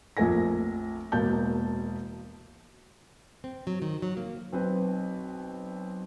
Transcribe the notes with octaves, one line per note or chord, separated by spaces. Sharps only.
A#1 F2 A3 A#4 G#5 A#6
E1 B2 A#3 A5 G6
C4
F#3
D#3
F#3
A#3
B1 C4 B4